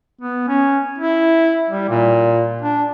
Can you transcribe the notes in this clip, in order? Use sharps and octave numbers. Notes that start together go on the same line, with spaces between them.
B3
C#4
E4
G3
A#2
D4